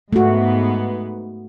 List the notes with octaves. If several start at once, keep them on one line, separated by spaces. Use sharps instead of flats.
G#2 A3 B3 F#4